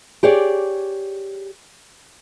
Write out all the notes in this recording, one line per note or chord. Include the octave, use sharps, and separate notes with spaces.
G4 G#4 C#5 D5